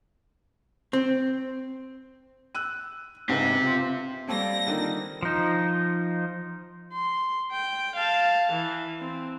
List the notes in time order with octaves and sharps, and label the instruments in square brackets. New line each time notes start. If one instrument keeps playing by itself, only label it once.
[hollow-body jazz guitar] C4
[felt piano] E6 F#6 D#7
[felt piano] G#2 C#3 B3 [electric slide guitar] C4 G4
[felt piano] F4 C6
[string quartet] G3 A#6 [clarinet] A#3 [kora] C4 A4 C#5
[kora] D3 D#3 F4
[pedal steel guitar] F3 D#4
[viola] C6
G5
F5 A5
E3
C4